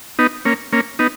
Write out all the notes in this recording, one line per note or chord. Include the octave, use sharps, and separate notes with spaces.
B3 D#4
A#3 C#4
A#3 C#4
B3 D#4